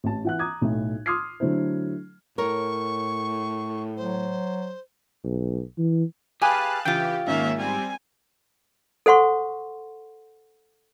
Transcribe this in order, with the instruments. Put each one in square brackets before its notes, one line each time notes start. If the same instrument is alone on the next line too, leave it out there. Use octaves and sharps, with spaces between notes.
[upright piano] A1 A5
E3 F#5 F#6
A#5 D6 D#6 G#6
B1 A2
C6 D6 D#6 F6 G#6 C7
D3 F#3 A3 E4 C5
[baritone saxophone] A2 [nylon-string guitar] A#4 C#5 [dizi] C#6
[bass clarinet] F#3 [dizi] C5
[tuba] B1
E3
[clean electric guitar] G4 G#4 B4 [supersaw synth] F5 A5 F#6 [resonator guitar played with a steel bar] G#5
[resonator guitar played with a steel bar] C#3 F4 [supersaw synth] E3 G4 [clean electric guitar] G5
[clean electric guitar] G#2 [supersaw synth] D#3 A#3 C#4 [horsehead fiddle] E5 F5
[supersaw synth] G3 C4 [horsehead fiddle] G#5
[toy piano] A4 C5 F#5 C6 C#6